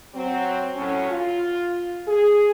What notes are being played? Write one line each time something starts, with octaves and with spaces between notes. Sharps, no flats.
F#3 C4
A2 F#3 C#4
F4
G#4